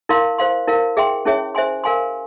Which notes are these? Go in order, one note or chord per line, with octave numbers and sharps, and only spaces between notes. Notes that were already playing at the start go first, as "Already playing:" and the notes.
E4 A#4 F5 C6
C5 F5 C6
E4 A#4 F5
G#4 E5 G5 C6
C#4 E4 G#4 C#5 E5
C5 E5 G#5 C6
A#4 F5 G#5 C6